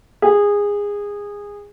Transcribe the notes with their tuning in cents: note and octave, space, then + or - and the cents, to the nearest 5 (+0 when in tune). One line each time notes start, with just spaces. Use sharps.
G#4 -20